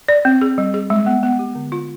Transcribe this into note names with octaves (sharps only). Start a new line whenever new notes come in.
D5
C4
G#4
G3
G#4
G#3
B3
B3
G4
D3
F4